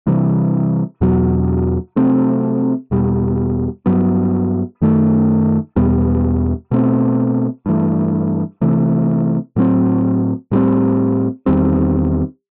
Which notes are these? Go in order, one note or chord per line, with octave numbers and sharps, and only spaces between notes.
C3 E3 G3
E2 B2 F#3
C3 F#3 A3 C4
E2 B2 G3
G2 F#3 B3
F#2 D#3 A3
E2 B2 G3 B3
B2 A3 C4
G2 E3 A3
C3 E3 A3
A2 F#3 C4
A2 G3 C4
E2 D#3 G3 C4